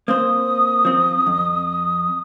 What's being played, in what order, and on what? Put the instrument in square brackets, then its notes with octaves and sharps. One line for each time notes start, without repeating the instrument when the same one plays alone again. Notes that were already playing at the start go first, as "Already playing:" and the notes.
[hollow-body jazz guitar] A#3 C4 C5 [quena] D#6
[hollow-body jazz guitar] F3 C4
F2